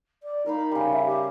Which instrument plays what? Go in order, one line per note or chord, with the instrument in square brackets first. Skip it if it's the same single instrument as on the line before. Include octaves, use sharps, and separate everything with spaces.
[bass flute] D5
[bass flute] D#4 [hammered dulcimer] A#4 F5 B5
[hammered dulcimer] C#3 G3
[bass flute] E5
G4